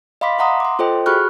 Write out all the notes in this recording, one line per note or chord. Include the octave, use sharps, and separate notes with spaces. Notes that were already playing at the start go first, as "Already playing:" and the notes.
D#5 F5 B5 C6 D6 B6
E5 F#5 A#5 C6 D#6
C6 D6
F4 A4 C5 D#5 G5
F#4 G#4 B5 C#6 F6 F#6